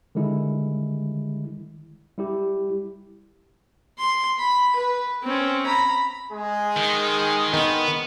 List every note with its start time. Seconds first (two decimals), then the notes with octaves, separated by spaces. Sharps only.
0.15 D3 D#3 G3 G#3 E4
2.18 G3 E4 G4
3.98 C6
4.39 B5
4.76 B4
5.23 C4 C#4
5.66 A#5 B5
6.32 G#3 G#4
6.76 D#3
7.53 D#3 B3